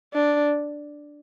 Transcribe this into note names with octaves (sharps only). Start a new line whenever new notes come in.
D4